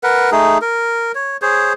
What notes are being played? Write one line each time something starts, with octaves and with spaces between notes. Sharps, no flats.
A#4 B4 F#5
A3 D#4 G#4
A#4
C#5
G#4 C5 C#5